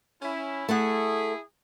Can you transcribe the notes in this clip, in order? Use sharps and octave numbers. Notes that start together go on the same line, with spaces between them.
C#4 E4
A3 E4 G#4 A4 F#5